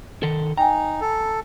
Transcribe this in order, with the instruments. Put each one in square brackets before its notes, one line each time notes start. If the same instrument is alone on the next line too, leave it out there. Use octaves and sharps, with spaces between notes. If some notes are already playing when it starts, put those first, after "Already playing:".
[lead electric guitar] D#3 A4
[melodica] D#4 [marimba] G5 G#5 [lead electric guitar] A#5
[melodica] A4